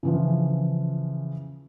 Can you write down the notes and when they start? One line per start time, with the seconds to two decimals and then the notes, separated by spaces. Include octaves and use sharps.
0.03 C#3 E3 F3